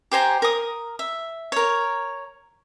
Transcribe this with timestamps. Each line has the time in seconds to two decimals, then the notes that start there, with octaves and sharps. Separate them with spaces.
0.12 G4 C5 G#5 A#5
0.42 A#4 D#6
0.99 E5
1.52 A#4 C#5